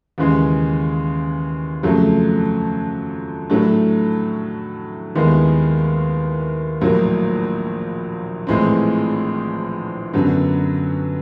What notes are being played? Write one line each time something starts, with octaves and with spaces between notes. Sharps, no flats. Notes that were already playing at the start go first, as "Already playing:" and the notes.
D#2 C#3 E3 G#3
F2 C#3 F#3 A3
A2 F#3 A3 D4
D#2 D#3 G#3 B3 E4
A#1 A2 F#3 A#3
A#1 A2 E3 G#3 C4
F#2 D3 F#3 B3